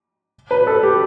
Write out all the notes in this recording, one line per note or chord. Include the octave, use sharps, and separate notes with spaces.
B4
A4
G4